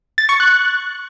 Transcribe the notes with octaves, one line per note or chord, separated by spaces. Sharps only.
A6
C#6
F#6